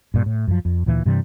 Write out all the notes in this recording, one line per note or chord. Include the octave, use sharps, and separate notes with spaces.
G2 A#2
A2
F#2 F3
F2
D2 A#2 E3 A#3
G2 C3 E3 G3